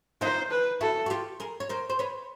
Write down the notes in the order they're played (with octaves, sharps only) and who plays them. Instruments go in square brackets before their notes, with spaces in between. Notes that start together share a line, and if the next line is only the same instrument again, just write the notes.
[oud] D#4 F4 [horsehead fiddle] C5
[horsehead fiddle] B4
[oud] E4 F#4 [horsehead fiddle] A4
[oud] F#4
F4 G4
G#4 A#4
C#5
A#4 C5
C5
B4 C#5